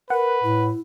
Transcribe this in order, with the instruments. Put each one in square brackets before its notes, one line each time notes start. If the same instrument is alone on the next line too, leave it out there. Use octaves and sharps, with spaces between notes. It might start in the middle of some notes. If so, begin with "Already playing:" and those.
[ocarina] A#4 [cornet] B4 [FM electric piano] F#5
[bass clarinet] A2 [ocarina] E4